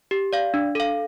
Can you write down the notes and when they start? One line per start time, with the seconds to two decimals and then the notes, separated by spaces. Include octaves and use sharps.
0.11 G4
0.33 D5 F5
0.54 D4
0.75 A4 F5